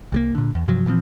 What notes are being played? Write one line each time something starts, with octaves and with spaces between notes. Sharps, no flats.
C2 G3 A#3
A#2 D3
E2
G2 C3 F3 F#3
A#2 E3 F3 C4